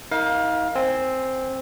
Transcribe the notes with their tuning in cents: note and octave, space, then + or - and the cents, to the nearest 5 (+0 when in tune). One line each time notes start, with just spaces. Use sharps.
D#4 +40 A#4 +0 F5 +20
C4 +0 G#5 -15